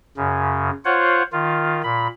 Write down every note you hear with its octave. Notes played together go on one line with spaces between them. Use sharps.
F#2 C#3
F4 C5 C#5 F#5
D#3 F4
A#2 B5